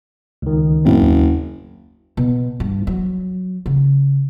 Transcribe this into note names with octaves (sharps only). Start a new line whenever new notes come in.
C#2 D#3
F#1 F2 A2 C4
D#2
B2
G2
F#3
C#3